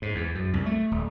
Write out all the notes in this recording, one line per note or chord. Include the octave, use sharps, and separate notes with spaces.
G#2
E2
F#2
C2
A3
D#1